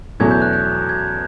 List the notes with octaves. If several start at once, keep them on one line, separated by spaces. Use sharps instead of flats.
E2 B2 F#3 A3 C#4 G#6
G6
F#6
G6
G#6